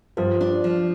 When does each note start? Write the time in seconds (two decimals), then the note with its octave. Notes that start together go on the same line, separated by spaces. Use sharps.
0.17 G2 F3 F4
0.41 D4
0.64 F3